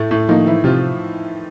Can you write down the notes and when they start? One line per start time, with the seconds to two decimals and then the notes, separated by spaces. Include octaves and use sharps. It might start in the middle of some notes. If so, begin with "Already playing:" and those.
Already playing: A2 A3
0.11 A2 A3
0.28 D#3 F3 A#3 D#4
0.46 E3 E4
0.64 C3 F3 F4